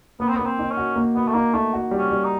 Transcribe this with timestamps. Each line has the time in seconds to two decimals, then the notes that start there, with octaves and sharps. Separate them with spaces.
0.20 A#3 B3
0.28 C4
0.36 A#3 B3
0.45 C4
0.59 D#4
0.71 C#4
0.77 F#4
0.96 A#3
1.15 B3 F#4
1.28 A3
1.34 A#3 D#4
1.54 A3 D#4
1.73 F#4
1.91 G3
1.98 C#4
2.11 G3
2.24 D#4